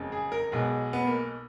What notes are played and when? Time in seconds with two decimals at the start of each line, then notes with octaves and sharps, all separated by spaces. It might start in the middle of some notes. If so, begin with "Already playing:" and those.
Already playing: F#1 F2 C#3 G#3
0.12 G#4
0.32 A#4
0.52 B1 B2 G#3 G#4
0.93 B3
1.07 A#3